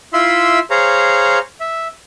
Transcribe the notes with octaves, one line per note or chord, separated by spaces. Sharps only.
E4 F4 E5 B5 C6 E6
G#4 C5 C#5 F5 A#5
E5